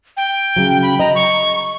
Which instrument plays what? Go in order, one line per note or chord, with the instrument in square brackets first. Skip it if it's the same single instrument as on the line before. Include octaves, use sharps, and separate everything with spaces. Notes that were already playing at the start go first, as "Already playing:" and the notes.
[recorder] G5
[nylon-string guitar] C#3 F#3
[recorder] B5
[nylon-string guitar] D#5 [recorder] A#5
[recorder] C#6